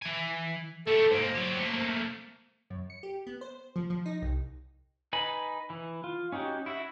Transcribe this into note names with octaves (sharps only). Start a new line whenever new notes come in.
E3 G#5
A3 G4 A4
G#2 A#3 C5
F#3 G4
A3 A#3
F#2
C#7
G4
B3
C5
F3
F3
D#4
C2
D#4 B4 G#5 B5
E3
F4
C#4 D#4 F#4 G4
E4 F#4 E5